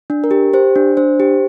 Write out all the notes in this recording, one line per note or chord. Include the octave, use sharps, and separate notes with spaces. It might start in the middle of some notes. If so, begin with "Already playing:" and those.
D4
A#4
G4
G4 C5
D4
D4 C5
G4